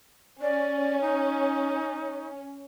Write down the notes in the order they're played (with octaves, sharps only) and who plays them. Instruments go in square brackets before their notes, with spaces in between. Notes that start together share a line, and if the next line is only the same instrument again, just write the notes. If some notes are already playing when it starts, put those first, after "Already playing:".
[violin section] C#4 [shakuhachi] D5
[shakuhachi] D#4